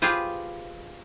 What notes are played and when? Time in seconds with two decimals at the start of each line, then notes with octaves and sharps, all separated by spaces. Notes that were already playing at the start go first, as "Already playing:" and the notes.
0.02 F4 G4 G#4 B4 C5